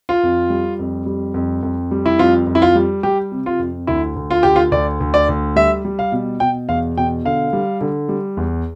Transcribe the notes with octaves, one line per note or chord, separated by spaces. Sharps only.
F4
F2
G3
F2
G3
F2
F2
G3
E4
F2 F4
F2
E4
F4
G3
G3 G4
C3
F4
F2
D2 E4
D2
F4
D2 G4
F4
D2 D5
D2
D5
D2
G3 E5
G3
F5
B2
B2 G5
E2 F5
B2 G5
D3 F5
G3
D3
G3
E2